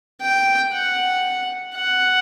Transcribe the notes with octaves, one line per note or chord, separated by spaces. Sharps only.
G5
F#5
F#5